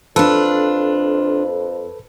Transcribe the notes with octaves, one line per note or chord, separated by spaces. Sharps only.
F2 D4 F4 A4 B4